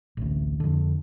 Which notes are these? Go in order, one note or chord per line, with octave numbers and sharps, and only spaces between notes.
A1 D2
F2 D3